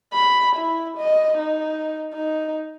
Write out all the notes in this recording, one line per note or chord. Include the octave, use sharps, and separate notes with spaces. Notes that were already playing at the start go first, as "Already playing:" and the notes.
B5
E4
D#5
D#4
D#4